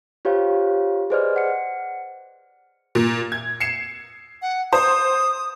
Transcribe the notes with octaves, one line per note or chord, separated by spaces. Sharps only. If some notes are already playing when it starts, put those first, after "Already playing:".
F4 G4 C5 C#5 F5
G#4 B4 C5 D5 D#5 F6
F#5 C#7
A#2
G#6
C7 C#7 E7
F#5
C5 D#6